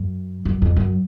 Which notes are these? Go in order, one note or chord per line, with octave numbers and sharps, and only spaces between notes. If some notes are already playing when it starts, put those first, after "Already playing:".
Already playing: F#2
F#2
F2
F#2